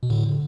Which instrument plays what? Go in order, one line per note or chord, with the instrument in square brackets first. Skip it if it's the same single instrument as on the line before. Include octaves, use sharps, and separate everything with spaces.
[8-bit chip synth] B2
A2 D3